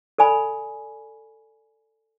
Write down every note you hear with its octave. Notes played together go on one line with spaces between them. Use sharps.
A4 D5 G#5 B5